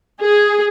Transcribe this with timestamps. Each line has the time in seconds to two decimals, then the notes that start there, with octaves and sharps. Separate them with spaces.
0.22 G#4